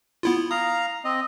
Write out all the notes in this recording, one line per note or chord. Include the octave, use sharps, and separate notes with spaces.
B3 E4 F4
F5 A#5 D#6
C4 D#5